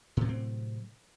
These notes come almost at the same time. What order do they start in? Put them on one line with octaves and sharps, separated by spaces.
A2 C3 F#3 C4